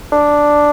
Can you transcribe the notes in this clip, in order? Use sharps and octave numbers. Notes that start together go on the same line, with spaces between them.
D4